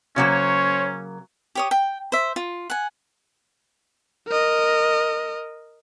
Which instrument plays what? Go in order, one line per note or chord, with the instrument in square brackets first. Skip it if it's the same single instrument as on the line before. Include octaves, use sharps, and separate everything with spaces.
[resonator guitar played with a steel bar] C#3 F#3 A#3 [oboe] C#4 [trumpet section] C5 C#5
[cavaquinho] G4 C#5 D#6
G5
C5 E5
F4
F#5 G#5
[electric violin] A#4 D#5